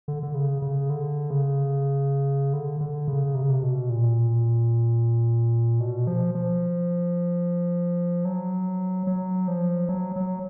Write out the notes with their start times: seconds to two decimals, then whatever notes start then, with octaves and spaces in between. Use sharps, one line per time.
0.08 D3
0.23 D3
0.35 C#3
0.62 C#3
0.90 D3
1.30 C#3
2.53 D3
2.81 D3
3.08 C#3
3.35 C3
3.42 C#3
3.49 C3
3.62 B2
3.90 A#2
5.80 B2
6.07 F3
6.35 F3
8.25 F#3
9.07 F#3
9.48 F3
9.89 F#3
10.16 F#3